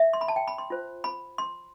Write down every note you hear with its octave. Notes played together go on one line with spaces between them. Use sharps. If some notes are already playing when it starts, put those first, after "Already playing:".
Already playing: E5
C6
B5
A5
G5
B5
C6
F4 C5
B5
C6